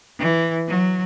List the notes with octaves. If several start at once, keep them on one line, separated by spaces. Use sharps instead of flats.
E3
F#3